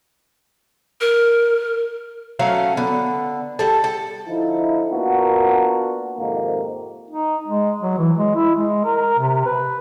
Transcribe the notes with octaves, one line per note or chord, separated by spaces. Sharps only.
A#4
F#3 A3 C#4 F5
D3 B3
G3 A4
A4
D3 F3 D#4 E4
A#3 B3 D4 F4 F#4 A#4
F2 G#2 C3 D#3 A#3
D#4
G#3
F#3
E3
G#3
E4
G#3
A#4
C3
B4